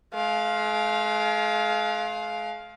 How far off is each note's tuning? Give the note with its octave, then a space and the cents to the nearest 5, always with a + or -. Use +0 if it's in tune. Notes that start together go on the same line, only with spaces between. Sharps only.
G#3 +45 F5 +0